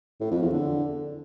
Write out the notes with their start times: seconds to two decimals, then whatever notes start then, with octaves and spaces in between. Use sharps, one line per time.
0.20 A2
0.31 F2
0.42 E2
0.53 D3